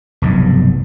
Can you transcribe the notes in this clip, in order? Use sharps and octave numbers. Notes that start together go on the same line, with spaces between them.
F1 B1 G2